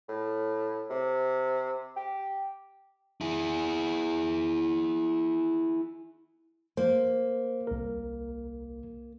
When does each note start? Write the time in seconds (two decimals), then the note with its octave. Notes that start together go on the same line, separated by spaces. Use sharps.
0.08 A2
0.90 C3
1.96 G4
3.21 E4 G#4
6.77 A#3 C5
7.67 C2 A#4